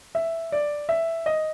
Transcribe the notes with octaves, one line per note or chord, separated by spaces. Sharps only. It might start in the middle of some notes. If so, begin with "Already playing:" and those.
E5
D5
E5
D#5